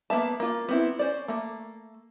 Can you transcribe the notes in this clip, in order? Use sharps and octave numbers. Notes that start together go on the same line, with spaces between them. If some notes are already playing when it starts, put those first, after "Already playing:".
A#3 B3 E5 A5
A#3 F4
B3 C4 E4
C#4 C5 D5
A3 A#3